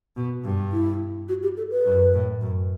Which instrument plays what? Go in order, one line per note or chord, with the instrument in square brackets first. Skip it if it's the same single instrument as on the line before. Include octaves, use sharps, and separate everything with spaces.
[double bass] B2
G2
[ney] E4
F#4
G4
A4
B4
[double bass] F#2
A2
F#2